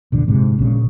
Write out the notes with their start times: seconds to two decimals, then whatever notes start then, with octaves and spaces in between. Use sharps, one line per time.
0.12 E1 A#1 D3
0.28 G#2 C3
0.59 A#1 C#3